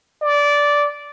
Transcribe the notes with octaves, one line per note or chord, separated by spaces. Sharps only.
D5